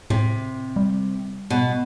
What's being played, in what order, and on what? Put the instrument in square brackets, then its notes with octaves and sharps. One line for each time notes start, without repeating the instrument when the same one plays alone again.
[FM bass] A2 [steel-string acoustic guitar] C3
[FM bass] G3
[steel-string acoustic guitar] B2